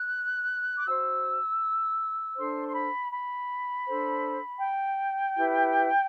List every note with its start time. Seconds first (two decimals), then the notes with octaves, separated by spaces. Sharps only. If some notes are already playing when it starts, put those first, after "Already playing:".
Already playing: F#6
0.76 D6
0.87 F#4 C5 E6
2.36 D4 A4 C5 C6
2.66 C6
2.73 B5
3.11 B5
3.86 D4 A4 C5
4.60 G5
5.36 E4 G4 B4